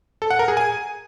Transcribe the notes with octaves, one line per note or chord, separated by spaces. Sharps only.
A4
F#5
A#4
G#4
G#5